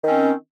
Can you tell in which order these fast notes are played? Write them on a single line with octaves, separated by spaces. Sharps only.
D#3 C#4 C4